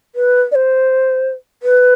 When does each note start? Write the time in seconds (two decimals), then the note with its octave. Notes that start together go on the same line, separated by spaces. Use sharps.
0.15 B4
0.52 D5
0.55 C5
1.63 B4